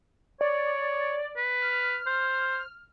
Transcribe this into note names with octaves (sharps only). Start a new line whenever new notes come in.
C#5 D5
B4
F6
C5